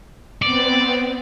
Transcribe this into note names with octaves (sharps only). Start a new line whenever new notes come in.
B3 C4 D5